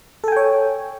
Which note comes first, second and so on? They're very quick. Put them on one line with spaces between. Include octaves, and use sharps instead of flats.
A4 G#5 G5 C#5